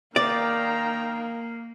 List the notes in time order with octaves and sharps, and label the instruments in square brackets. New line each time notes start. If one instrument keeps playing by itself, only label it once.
[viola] D#3 F5 [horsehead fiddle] A#3 [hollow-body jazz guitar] D5 [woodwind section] G5 A#5